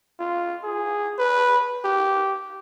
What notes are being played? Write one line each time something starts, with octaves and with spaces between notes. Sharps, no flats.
F4
G#4
B4
G4